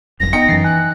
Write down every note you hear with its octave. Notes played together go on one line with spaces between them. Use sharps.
D1 G1 F#2 A#6
B3 D#4 G5 C#7
F#2 E3 A6 C7
G#5 F#6